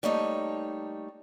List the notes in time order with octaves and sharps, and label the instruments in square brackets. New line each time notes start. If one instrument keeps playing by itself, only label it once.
[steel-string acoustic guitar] G3 A3 A#3 D#4 C#5